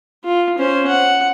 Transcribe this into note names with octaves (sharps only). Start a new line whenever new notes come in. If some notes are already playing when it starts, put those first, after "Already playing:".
F4
C#4 C5
F#5